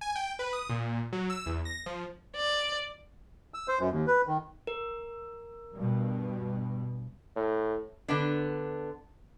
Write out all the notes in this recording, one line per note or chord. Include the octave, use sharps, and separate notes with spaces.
G#5
G5
B4
D#6
A#2
F#3
E6
E2
A#6
F3
D5
E6
C5
F#2
D#2
B4
D#3
A#4
G2 B2
A2
D3 B3 D4